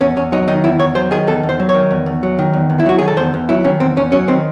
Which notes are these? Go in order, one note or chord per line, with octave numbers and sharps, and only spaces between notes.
E2 C#4
E2 C#4
F#3 D#4
D#3 D#4
E2 E4
E2 C#5
F#3 C5
D#3 G#4
E2 A4
E2
C5
F#3
C#5
D#3
E2
E2
F#3
D#3
E2
E2
E4
F#3 F#4
D#3 G#4
A4
E2 C5
E2
F#3 E4
D#3 C#4
E2 C4
E2 C#4
F#3 C#4
D#3 C4